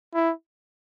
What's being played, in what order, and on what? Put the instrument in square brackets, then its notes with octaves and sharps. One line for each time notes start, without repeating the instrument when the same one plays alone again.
[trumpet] E4